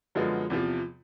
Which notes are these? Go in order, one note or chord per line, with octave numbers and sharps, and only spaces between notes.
F#2 D3 F3 G#3 B3
E2 C3 F3